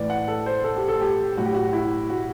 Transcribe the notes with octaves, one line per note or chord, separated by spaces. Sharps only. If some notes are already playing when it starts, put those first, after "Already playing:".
Already playing: A2 E3 D5
F#5
A4
C5
A4
G4
A4
G4
A2 F#3 F#4
G4
F#4
E4
F#4